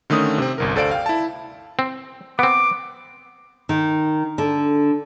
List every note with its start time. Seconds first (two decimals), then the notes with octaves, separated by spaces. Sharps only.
0.10 D3 D#3 A3 C#4 D#6
0.38 C3 C4
0.58 G1 C2 A#4
0.76 D2 A4 C5 D5 F5 D7
0.91 F5 G5
1.06 E4 A5
1.79 C4
2.39 B3 C4 D6
3.69 D#3
4.38 D3